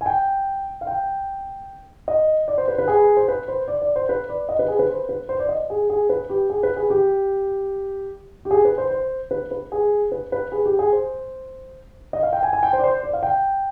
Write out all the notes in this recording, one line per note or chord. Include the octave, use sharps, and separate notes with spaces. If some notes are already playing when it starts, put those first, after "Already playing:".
G#5
G5
F5
G5
D#5
D5
C5
B4
B4
G#4
C5
B4
C5
D5
D5
C5
B4
D5
D#5
B4
G#4
B4
C5
B4
C5
D5
D#5
G#4
G#4
B4
G4
G#4
B4
G#4
G4
G4
G#4
B4
C5
C5
B4
B4
G#4
B4
B4
G#4
G4
G#4
C5
D#5
F5
G5
G#5
G#5
G5
C5
D5
C5
D5
F5
G5